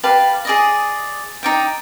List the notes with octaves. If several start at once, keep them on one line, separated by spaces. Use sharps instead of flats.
G4 B4 F5 A5
G#4 D5 D#5
D#4 D5 G5